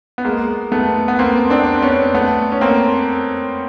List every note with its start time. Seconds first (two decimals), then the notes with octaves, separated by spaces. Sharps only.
0.18 B3
0.25 G#3 A#3
0.72 A3 B3
1.08 B3
1.19 A#3 C4
1.50 C4 D4
1.82 B3 C#4
2.14 A3 B3
2.52 C#4
2.61 A#3 C4